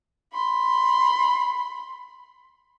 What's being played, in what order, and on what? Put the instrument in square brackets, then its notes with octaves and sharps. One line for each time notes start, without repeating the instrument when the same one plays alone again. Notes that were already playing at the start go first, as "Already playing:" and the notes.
[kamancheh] B5 C6